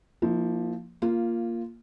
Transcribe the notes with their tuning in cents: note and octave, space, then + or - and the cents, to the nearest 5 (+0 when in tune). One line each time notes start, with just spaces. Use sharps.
F3 +0 A#3 +0 E4 -40
A#3 +0 F4 -10